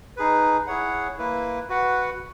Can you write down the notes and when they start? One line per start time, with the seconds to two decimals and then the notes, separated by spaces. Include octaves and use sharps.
0.17 D#4 G#4 B4
0.67 E4 G#4 C#5 F#5
1.18 A#3 E4 B4
1.69 F#4 B4 F#5